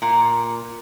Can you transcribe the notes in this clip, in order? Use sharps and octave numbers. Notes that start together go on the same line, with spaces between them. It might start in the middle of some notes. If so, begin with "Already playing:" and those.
A#2